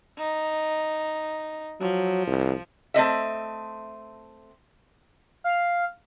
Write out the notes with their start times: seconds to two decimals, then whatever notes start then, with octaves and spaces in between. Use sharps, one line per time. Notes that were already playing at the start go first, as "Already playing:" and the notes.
0.18 D#4
1.81 F3 F#3
2.27 C2
2.94 A3 C4 D#5 E5
5.44 F5